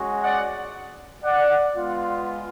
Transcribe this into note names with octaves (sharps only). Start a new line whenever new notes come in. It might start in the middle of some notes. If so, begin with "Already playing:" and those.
Already playing: G#3 C#4 F#4
D5 F#5
D5 F#5
G#3 B3 F4